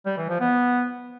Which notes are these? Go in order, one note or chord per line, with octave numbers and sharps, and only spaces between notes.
G3
E3
F3
B3